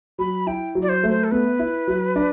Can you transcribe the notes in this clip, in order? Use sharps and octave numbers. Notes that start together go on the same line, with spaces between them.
F#3 B5
E4 G5
F#3
D5
C5
A3
C5
A4
B3 B4
E4
F#3
D4